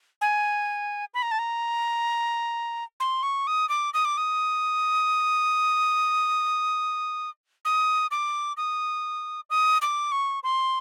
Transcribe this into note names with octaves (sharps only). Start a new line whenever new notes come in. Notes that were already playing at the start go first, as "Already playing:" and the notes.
G#5
B5
A#5
A5
A#5
C6
C#6
D#6
D6
D#6
D6
D#6
D#6
D6
D#6
D#6
D6
C#6
C6